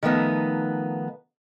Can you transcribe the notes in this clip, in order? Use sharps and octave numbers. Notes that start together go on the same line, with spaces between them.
D#3 F3 A3 B3 D#4